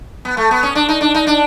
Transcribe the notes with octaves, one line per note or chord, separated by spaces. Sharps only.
B3
A3
B3
C#4
D4
D#4
D4
D#4
D4